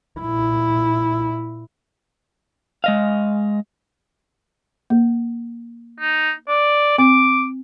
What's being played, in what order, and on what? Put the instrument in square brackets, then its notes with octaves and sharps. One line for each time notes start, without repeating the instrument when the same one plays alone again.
[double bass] A#2 E4
[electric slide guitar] G#3 D#5 F5
[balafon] A#3
[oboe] D#4
D5
[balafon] C4 [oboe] D6